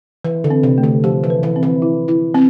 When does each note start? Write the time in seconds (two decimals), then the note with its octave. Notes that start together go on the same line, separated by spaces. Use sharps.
0.24 E3 B4
0.44 D3
0.50 C4
0.63 C3
0.78 A3
0.83 D3
1.04 F3 G4
1.24 E3
1.30 B4
1.43 E3
1.56 C4
1.63 E3
1.82 E4
2.08 E4
2.34 C4